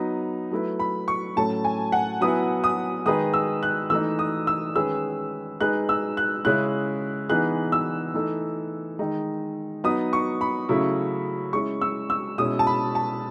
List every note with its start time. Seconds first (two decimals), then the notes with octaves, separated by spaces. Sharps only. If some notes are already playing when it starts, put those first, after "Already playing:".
Already playing: F#3 B3 D#4
0.51 F#3 A3 E4 B4
0.79 B5
1.08 C#6
1.36 A2 F#3 A3 C#4 A5
1.64 G#5
1.92 F#5
2.21 F#3 B3 E4 B4 D#6
2.64 D#6
3.06 D#3 G#3 D#4 G#4 B4 D#6
3.34 E6
3.63 F#6
3.90 E3 A3 D#4 E6
4.19 D#6
4.47 E6
4.75 D#3 G#3 C#4 G#4 B4 E6
5.60 G#3 D#4 G#4 B4 F#6
5.89 E6
6.17 F#6
6.45 C#3 G#3 C#4 E4 F#6
7.29 E3 B3 D#4 G#4 F#6
7.72 E6
8.14 E3 A3 D#4 A4
8.99 D#3 G#3 D#4
9.84 F#3 B3 D#4 D#6
10.13 C#6
10.41 B5
10.69 C#3 F#3 A3 E4
11.53 G#3 C#4 E4 C#6
11.81 E6
12.10 E6
12.38 B2 G#3 C#4 E4 D#6
12.59 A5
12.67 B5
12.95 A5